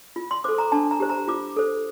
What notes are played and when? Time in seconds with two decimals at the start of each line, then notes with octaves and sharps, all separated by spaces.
0.16 F4
0.31 C6
0.44 A4 C5 D6
0.58 A#5
0.72 D4 A5
0.91 A#5
1.00 G4 C5
1.09 A#5
1.28 F4 D6
1.57 A4 C5